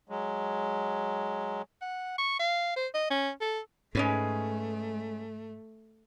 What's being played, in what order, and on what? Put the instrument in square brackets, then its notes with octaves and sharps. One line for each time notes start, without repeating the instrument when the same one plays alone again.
[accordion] F#3 G#3
[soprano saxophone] F#5
C#6
F5
C5
D#5
C#4
A4
[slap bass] G#2 [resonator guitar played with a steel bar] G#3 C#4 B4 [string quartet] A3